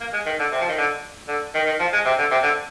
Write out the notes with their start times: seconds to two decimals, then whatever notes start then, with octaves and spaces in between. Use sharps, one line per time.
0.01 A#3
0.13 G#3
0.26 D#3
0.39 D3
0.52 C3
0.61 F3
0.69 D#3
0.78 D3
1.28 D3
1.55 D#3
1.66 D#3
1.80 F3
1.93 G#3
2.05 C3
2.18 D3
2.31 C3
2.43 D3